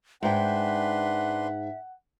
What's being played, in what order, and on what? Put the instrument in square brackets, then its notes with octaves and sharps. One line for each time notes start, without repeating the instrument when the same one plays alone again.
[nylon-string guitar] G#2 G5 [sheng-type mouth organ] D4 B4 C6 [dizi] E5 [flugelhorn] F#5